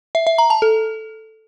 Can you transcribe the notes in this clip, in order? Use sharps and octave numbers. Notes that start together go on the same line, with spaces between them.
E5
E5
A#5
A5
A4